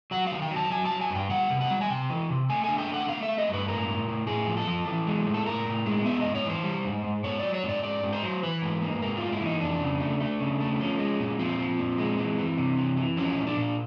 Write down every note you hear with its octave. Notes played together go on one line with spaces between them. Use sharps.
F#3 F#5
F5
D#3
G5
F#3
A5
F#3 G#5
A5
F#3
G#5
G2 G5
G3 F#5
C3
F#5
G3
G#5
C3 G5
E3
C3
A3 G#5
D3 G#5
G5
A3
F#5
A3 F5
E5
A3
D#5
G2 B4
A2 A#4
A2
A2
A2 G#4
F3
A4
F3
E3
G#3
A2
A4
A2 A#4
A2
G#3
B3 E5
D#5
G#2
C#5
E3 C5
G3
G#2
G#2
G#2 C#5
F#3 D5
C#5
G#2
D5
G#2 D5
G#2
C5
F#3
E3 B4
G#2
A#3
G#2 A#4
A#3 F4
E4
E3 D#4
F2 D4
C#3
A3
A3
C#3
A3
F3 C#4
G#3
A#2
F3 C4
F3
A#2
G#3
E3
E3
C3
E3
E3
F3 C#4
A#2
D4
A#2